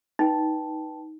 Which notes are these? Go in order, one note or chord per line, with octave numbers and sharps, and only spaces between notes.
D#4 B4 G5 A5